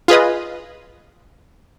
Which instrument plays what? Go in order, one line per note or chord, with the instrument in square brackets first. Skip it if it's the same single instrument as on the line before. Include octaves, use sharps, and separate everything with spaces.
[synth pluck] F4 G#4 B4 D#5